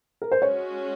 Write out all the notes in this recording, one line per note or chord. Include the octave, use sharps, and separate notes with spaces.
A#4
C5
G#3 C#4 F#4 C#5